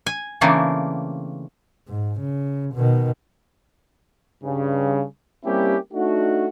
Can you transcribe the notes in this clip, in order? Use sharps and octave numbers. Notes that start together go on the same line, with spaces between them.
G#5
C#3 E3 A3 A#3 C4 D4
G#2
C#3
B2 D#3
G2 C#3
G3 A#3 C4 C#4 E4 G4
A3 D4 D#4 F#4